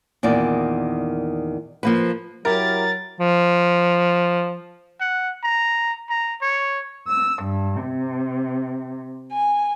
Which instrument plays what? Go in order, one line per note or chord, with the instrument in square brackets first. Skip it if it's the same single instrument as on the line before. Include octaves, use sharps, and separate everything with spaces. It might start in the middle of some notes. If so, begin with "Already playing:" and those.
[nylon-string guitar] E2 A#2 D#3 D5
F3 A#3 B4
[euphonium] F#3 [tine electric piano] E4 G4 [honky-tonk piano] A#4 [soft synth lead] A6
[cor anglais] F3
[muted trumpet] F#5
A#5
A#5
C#5
[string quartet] E6
G2
C3
G#5